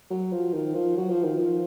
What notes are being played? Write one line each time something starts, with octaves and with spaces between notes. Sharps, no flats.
F#3
F3
D#3
F3
F#3
F3
D#3
F3